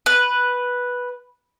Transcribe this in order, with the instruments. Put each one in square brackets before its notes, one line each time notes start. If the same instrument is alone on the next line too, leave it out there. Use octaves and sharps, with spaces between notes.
[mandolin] B4